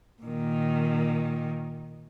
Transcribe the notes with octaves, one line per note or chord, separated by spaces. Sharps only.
A#2 D#3